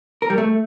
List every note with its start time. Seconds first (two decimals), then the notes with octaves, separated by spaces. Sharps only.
0.22 A#4
0.30 G3
0.38 A3